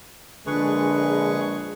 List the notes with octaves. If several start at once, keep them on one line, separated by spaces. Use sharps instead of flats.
A#1 D3 G#3 G#4 B4 C#6